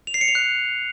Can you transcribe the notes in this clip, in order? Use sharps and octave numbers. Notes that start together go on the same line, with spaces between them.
F7
C7
C#7
F7
F#6